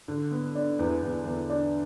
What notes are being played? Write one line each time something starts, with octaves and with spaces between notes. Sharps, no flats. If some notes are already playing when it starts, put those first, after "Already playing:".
D3
B3
D4
E2
E2
E2
D4